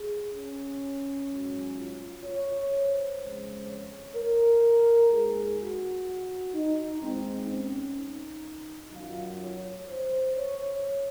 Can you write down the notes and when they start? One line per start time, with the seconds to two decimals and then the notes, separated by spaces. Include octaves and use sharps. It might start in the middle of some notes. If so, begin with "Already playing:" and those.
Already playing: G#4
0.33 C#4
1.28 G#2 F#3
1.76 F4
2.24 C#5
2.72 C5
3.19 F2 C#3 G#3
3.67 C#5
4.15 A#4
5.10 D#2 D#3 G#3 G#4
5.58 F#4
6.54 D#4
7.01 D#2 D#3 G#3 C4
7.49 C#4
7.97 D#4
8.92 F#2 D#3 F#3 F4
9.40 C#5
9.88 C5
10.35 C#5